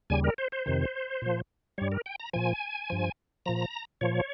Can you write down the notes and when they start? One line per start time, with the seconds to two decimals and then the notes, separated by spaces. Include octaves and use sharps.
0.10 D#2 C#3 G3 G#5
0.24 A#4
0.38 C5
0.52 C5
0.66 F2 C3 D#3
1.22 A#2 F3
1.78 G2 G3 C#5
1.92 A#4
2.06 G5
2.20 A#5
2.33 A#2 F3 G#5
2.90 G2 F3
3.46 A#2 F3 A#5
4.01 A#2 F3 C#5